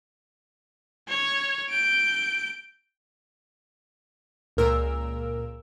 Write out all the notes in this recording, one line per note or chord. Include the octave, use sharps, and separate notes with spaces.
C#5
G6 D7
C#2 A#2 A#4 E6 D7